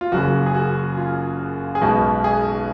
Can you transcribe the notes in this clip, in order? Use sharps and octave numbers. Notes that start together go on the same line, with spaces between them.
F4
F#1 F#2 C#3 F#4
G#4
F#4
F4
G#4
B1 B2 G#3 B3 F#4
G#4